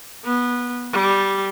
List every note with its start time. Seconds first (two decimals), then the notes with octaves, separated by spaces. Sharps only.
0.24 B3
0.92 G3